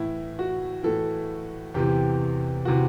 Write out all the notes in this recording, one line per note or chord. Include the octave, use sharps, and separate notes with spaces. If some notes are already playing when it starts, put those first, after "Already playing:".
Already playing: A2 E3 E4
F#4
A2 E3 A4
E2 C3 E3 G4
C3 E3 F#4